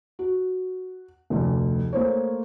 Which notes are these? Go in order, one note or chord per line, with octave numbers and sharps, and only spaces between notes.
F#4
F1 D2
A3 A#3 C5 C#5